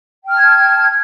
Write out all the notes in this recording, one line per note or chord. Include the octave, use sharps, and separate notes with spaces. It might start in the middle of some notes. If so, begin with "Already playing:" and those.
G5 A5 F6 G#6